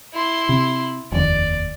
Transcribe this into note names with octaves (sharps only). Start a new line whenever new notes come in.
E4 C6
C3
F1 D#2 D5